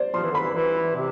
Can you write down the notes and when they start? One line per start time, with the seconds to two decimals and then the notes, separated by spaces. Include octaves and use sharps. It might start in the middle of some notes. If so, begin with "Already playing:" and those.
Already playing: C5 D5
0.14 F3 C6
0.23 E3
0.31 D3
0.35 E3 B5
0.54 E3
0.95 C3